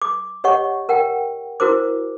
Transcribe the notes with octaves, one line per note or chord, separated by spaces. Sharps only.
D6
G4 C#5 D#5 F#5 C#6
A#4 F#5 G5
E4 F#4 A#4 C5 D6